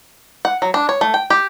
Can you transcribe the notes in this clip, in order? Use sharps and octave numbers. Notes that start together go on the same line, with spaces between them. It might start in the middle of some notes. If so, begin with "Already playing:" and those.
F#5
F#3
D4
C#5
A3
G5
G4